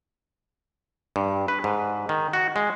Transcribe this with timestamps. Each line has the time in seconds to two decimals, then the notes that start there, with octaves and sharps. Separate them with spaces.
1.16 G2
1.48 B4
1.64 G#2
2.09 D#3
2.33 F#4
2.56 G#3